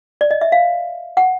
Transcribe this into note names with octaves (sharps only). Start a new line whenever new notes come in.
D5
D#5
E5
F5
F#5